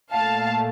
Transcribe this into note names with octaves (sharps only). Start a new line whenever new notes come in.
A#2 A3 F5 A5